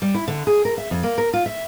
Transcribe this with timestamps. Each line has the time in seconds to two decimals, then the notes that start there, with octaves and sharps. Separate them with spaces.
0.02 G3
0.14 E4
0.28 D3
0.47 G#4
0.65 A#4
0.78 E5
0.91 F2
1.03 A#3
1.18 A#4
1.33 F4
1.46 E5